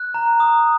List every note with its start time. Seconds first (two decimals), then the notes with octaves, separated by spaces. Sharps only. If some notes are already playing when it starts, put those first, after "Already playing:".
Already playing: F#6
0.14 A#5
0.40 D#6